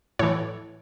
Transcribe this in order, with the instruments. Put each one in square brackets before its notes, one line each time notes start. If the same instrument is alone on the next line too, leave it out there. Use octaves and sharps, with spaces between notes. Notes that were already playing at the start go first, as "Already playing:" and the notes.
[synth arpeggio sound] A2 E3 C#5